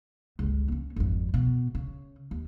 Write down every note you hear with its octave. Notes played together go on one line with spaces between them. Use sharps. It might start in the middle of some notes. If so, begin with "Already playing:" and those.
G1 C#2
A#3 C#4
G#1 F2
B2
C#3
D#2